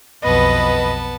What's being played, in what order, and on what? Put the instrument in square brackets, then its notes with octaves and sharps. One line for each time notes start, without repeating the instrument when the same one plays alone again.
[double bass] B1 F2 [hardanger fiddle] B3 A5 [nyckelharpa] B4 [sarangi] D#5